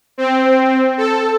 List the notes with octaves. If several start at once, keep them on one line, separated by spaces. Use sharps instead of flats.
C4
A4